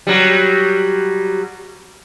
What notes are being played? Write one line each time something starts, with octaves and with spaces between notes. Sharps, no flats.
F#3 G3